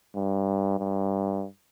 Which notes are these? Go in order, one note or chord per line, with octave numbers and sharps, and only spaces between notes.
G2
G2